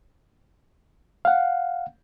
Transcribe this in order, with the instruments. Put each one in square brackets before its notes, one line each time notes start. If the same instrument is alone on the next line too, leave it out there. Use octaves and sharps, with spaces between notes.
[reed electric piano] F5 F#5